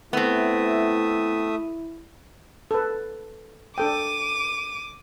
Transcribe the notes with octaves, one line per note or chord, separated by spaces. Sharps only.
A3 B3 C4 E4 E5 D#6
A4 B4
D4 A4 G5 D6 D#7